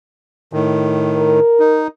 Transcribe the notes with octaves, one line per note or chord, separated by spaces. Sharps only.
A2 D#3
A#4
D#4